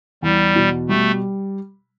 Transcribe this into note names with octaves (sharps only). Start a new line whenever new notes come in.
E2 G3
B2
G3 A3